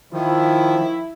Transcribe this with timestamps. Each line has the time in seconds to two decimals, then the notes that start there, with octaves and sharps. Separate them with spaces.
0.12 D#3 F3 E4